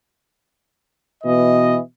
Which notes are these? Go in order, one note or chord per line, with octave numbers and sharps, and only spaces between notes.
B2 E3 D#5